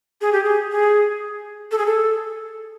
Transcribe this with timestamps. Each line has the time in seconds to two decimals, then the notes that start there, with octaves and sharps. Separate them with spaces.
0.21 G#4
0.32 G4
0.44 G#4
0.71 G#4
1.71 A4
1.78 G#4
1.86 A4